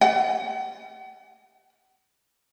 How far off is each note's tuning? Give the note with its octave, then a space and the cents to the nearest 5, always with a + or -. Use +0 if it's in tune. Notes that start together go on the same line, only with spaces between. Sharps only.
F#5 +40